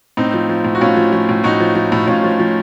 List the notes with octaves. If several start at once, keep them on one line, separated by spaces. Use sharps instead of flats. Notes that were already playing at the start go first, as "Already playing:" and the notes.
A2 C4 D#4
F3
F3
A2
F#4
A2 C#4 F4
F3
F3
A2
A2 D#4 F#4
F3
F3
A2
A2 C#4 F4
F3
F3